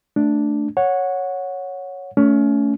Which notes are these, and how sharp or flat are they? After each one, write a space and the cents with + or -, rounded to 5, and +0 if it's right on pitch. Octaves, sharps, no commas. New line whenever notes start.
A3 +0 D4 +0
C#5 +0 F#5 -15
A3 +0 C#4 +30